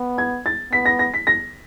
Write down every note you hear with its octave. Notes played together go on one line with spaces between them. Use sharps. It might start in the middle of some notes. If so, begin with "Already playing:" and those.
Already playing: B3
G#6
A6
B3 B6
A#6
A#6
B6
A#6